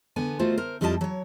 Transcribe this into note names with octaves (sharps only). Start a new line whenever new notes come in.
D3 B3 G#5
D#3 A3 F4 F#4 C5
A#4 C5
F2 G3 E4 F4 D#5 A5
F#3 C#5